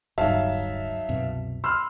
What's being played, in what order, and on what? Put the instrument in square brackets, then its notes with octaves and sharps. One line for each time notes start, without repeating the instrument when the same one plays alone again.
[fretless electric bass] D1 G2 [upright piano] F#3 D#4 [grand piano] E5 F5 A5
[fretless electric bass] C2 F#2 B2
[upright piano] B5 F6 [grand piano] C6 E6